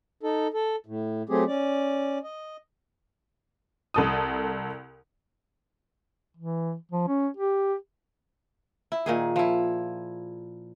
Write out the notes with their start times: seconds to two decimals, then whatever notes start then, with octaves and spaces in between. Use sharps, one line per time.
0.23 D#4 A4
0.54 A4
0.86 A2
1.29 F#3 A3 C4 G4 G#4
1.47 C#4 D5
2.24 D#5
3.94 C2 A4 D#6
6.37 E3
6.92 F3
7.08 C#4
7.37 G4
8.92 E4
9.06 A#2 D#3 G#4
9.36 F3 E4